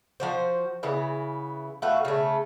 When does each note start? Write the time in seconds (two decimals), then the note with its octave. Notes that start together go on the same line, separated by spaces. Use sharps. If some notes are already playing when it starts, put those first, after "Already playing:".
0.20 F3 F#4 C5
0.83 C#3 E3 B3
1.82 A3 F4 F#4 B4
2.05 C#3 A3